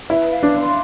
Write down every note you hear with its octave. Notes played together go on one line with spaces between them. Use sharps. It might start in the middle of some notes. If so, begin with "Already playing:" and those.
E4 B4
F5
D4
C6